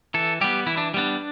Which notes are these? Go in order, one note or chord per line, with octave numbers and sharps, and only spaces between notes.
E3 A4
G3 B3 G4
E3 E4
D4
G3 B3 D4